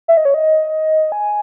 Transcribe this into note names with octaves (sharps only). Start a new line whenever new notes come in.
E5
D#5
C#5
D#5
G#5